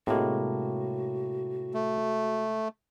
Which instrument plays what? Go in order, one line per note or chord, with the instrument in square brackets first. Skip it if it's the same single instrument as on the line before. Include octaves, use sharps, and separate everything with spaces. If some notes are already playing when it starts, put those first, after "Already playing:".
[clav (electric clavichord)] A2 A#3 [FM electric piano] C3 G#3 [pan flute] F#4
[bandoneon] A3